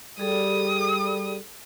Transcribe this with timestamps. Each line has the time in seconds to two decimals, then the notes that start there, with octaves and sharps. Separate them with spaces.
0.19 G3 G#4 A4 D#6